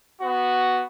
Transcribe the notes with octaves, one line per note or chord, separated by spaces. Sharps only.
B3 F#4